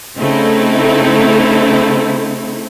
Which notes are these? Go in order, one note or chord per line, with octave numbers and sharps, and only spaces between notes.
C#3 A3 C4 D#4 E4